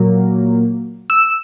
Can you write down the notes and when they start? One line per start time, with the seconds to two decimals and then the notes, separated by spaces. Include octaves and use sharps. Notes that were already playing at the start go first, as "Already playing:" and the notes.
Already playing: A#2 F#3 A#3
1.10 E6